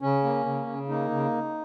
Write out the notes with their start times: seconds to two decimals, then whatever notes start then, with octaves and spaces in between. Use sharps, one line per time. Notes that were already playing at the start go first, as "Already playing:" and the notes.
0.02 C#3 C#4
0.24 A#3
0.46 C#3
0.67 C#3
0.88 A#3 D#4
1.10 C#3